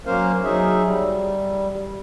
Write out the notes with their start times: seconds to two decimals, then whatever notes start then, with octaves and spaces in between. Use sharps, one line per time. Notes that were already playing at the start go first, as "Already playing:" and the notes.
0.06 F#3 A#3 C#4 A#4 C5 F5
0.44 F#3 D#4 G#4 E5
0.85 G3